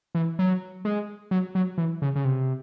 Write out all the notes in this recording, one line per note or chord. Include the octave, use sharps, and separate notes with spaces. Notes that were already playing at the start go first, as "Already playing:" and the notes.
E3
F#3
G#3
F#3
F#3
E3
C#3
C#3
C3